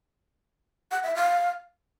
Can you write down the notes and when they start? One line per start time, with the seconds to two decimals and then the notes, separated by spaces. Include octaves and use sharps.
0.91 F#5
1.03 E5
1.15 F5